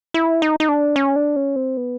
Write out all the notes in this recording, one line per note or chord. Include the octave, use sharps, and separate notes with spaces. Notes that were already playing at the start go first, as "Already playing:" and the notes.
E4
D#4
D#4
D4
C#4
D4
C#4
C4
B3